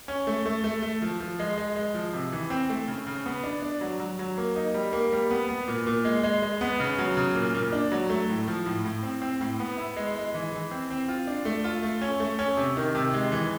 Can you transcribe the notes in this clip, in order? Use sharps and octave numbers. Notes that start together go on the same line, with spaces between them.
C#4
A3
A3
A3
A3
F3
F3
G#3
G#3
G#3
F3
C3
E3
C4
A3
C#3
C#3
B3
D4
D4
F#3
F#3
F#3
A#3
D#4
G3
A#3
G3
B3
B3
A#2
A#2
G#3
G#3
G#3
B3
C#3
F#3
C#3
A#2
A#2
D4
F#3
A3
A2
F3
A2
A2
C4
C4
A2
B3
E4
G#3
G#3
E3
E3
C4
C4
F4
D4
A3
F4
A3
C#4
A3
C#4
C3
D#3
C3
G#3
E3